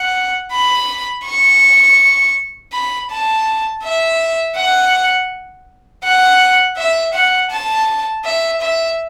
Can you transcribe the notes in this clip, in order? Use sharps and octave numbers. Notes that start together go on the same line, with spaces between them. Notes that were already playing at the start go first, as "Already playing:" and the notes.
Already playing: F#5
B5
C#6
B5
A5
E5
F#5
F#5
E5
F#5
A5
E5
E5